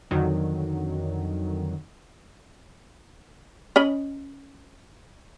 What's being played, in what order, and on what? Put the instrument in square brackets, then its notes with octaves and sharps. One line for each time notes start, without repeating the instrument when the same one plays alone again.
[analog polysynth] F2 D3 D#3 F#3
[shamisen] C#4 D#5 B5